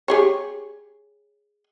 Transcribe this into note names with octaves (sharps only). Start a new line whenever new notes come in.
G4 G#4 C#5